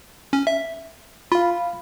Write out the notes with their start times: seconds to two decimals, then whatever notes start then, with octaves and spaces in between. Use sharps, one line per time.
0.33 C#4
0.47 E5
1.32 F4 F5 B5